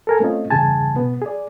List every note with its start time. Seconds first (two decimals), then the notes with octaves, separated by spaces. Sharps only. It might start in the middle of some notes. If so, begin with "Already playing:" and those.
0.07 A4 A#4 G#5
0.20 A3 C4 C#4 F4 D#5
0.50 E2 G2 C#3 G#4 G#5 A5
0.95 B2 B3
1.22 G#4 D5